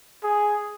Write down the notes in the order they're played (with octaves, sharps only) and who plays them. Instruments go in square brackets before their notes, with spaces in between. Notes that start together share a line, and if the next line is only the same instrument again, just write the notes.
[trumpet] G#4